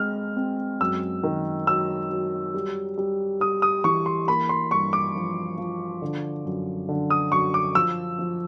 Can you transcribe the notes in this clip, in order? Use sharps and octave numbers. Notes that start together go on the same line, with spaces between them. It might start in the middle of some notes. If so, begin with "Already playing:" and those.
Already playing: G#3 C4 F6
C4
F#2 E6
D#3
F#3 E6
F#3
G3
G3
G3 D#6
D#6
E3 C#6
C6
A#3 B5
C6
G2 C#6
D6
F3
F3
D3
F#2
D3
D#6
F#2 C#6
D6
F3 E6
F3